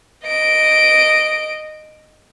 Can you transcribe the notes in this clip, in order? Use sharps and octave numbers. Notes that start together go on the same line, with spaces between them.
D#5 D7